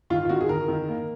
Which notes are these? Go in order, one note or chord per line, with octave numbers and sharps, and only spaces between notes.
D#3 F4
F4
D#3 F#4
G#4
D#3 A#4
D#3
A#3